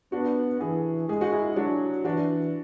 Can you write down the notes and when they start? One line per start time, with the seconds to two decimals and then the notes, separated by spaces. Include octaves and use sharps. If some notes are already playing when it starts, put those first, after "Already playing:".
0.12 B3 D4 F#4
0.61 E3 E4 G#4
1.09 G#3 G#4
1.21 F#4
1.32 E4 G#4
1.56 F#3 D4 F#4
2.04 E3 D4 F#4